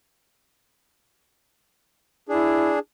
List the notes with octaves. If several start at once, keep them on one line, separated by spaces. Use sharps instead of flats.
D4 E4 G#4